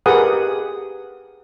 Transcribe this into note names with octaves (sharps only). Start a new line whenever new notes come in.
G4 G#4 A#4 B4 F#5 D#6